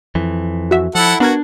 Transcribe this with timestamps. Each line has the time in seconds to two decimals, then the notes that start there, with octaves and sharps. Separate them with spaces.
0.15 F2 E3
0.71 F#4 E5
0.95 F3 E4 A4 F#5
1.20 B3 D4 F#4 A#4 G#6